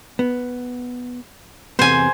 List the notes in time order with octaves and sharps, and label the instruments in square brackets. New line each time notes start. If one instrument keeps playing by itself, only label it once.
[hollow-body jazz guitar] B3
[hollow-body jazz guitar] E2 C3 B3 [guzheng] C5 G#5